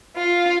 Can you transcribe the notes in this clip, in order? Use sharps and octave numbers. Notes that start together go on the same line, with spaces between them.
F4